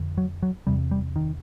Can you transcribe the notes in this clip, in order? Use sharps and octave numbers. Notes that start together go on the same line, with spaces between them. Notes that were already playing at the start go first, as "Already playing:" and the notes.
Already playing: F2 D3
F#3
F#3
E2 C3 G3
G3
D#3